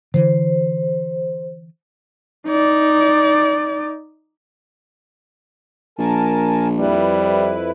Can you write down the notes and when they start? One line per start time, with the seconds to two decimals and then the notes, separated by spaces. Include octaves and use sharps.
0.14 D3 E3 C5
2.47 D#4 D5
5.99 A#1 A#4 G#5 A5
6.79 F2 G3 E4 B4